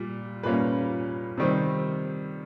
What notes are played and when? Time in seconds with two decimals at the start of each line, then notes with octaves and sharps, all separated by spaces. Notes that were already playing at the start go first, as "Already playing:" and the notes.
Already playing: A#2 G3
0.43 A#2 G3 A#3 C#4 B4
1.38 C3 D#3 G3 C4